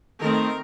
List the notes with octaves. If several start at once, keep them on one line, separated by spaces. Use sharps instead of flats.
D#3 A3 C4 A#4